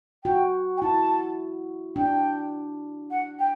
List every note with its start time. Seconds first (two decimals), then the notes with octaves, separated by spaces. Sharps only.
0.24 F#4 G5
0.77 G5
0.82 E4 A5
1.96 D4 G5
3.11 F#5
3.39 G5